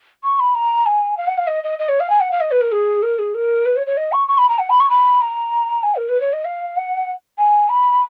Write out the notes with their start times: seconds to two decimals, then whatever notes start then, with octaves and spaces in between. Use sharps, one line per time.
0.24 C#6
0.40 B5
0.55 A#5
0.86 G#5
1.17 F5
1.27 F#5
1.38 F5
1.47 D#5
1.64 D#5
1.79 D#5
1.89 C#5
2.00 F5
2.10 G#5
2.20 F#5
2.31 F5
2.41 D#5
2.51 B4
2.61 A#4
2.72 G#4
3.03 A#4
3.19 G#4
3.35 A#4
3.66 B4
3.76 C#5
3.87 C#5
3.97 D#5
4.12 C#6
4.28 C#6
4.38 B5
4.49 A#5
4.59 F#5
4.70 B5
4.80 C#6
4.90 B5
5.21 A#5
5.83 G#5
5.96 A#4
6.09 B4
6.21 C#5
6.33 D#5
6.45 F5
6.77 F#5
7.38 G#5
7.69 B5